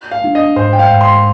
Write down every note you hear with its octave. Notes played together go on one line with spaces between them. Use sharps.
F5
D4
D#5
G#2 C5
G5
F5
G#2
C6